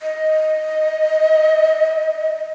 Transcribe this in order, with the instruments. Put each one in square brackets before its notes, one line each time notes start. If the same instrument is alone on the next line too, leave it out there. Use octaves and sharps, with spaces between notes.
[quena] D#5